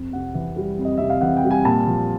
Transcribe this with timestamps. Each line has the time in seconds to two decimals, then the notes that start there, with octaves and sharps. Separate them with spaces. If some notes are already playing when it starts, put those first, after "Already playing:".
Already playing: F2
0.13 C3 F#5
0.34 E3
0.56 G3
0.79 F2
0.85 D#5
0.97 C3 E5
1.10 F5
1.21 E3 F#5
1.37 G5
1.44 G3
1.51 G#5
1.65 A#2 A5
1.87 F3